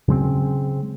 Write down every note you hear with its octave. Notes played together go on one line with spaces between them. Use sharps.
C#3 F#3 G#3 C4